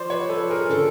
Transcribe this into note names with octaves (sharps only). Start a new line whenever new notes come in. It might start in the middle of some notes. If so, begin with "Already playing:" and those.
Already playing: F3 C5 D5
B4 C#5
F3 A4 B4
G#4 A#4
D3 A4